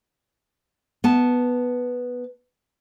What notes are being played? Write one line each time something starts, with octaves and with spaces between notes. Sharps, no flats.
B3 A5